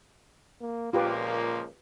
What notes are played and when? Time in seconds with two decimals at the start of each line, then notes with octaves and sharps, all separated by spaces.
0.61 A#3
0.93 C#2 A#2 F3 A#3 F4 G4 B4